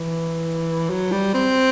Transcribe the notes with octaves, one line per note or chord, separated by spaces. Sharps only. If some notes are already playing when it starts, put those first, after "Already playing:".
Already playing: E3
F#3
G3
C4